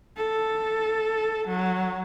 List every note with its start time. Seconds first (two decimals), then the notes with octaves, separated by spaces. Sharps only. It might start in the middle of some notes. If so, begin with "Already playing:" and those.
0.17 A4
1.48 F#3